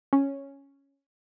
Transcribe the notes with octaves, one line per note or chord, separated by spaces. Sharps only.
C#4